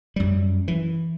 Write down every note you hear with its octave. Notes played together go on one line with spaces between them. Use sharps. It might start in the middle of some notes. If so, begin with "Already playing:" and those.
F#2 G3
E3